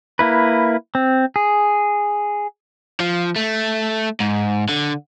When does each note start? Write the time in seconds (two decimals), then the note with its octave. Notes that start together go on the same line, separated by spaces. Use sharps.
0.19 A#3 E4 B4
0.95 C4
1.36 G#4
3.00 F3
3.36 A3
4.20 G#2
4.69 D3